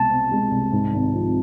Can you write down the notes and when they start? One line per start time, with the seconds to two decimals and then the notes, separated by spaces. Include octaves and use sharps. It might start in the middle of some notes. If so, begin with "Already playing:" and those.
Already playing: C2 B2 G#3 C4 A5
0.10 C4
0.32 G#3
0.51 C2
0.72 G#2
0.92 G#1
1.13 F3